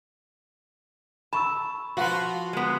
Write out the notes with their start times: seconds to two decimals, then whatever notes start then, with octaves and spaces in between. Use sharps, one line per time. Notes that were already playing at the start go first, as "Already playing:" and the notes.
1.33 A5 B5 C#6 E6
1.97 F3 F4 F#4 B4
2.53 G#3 B3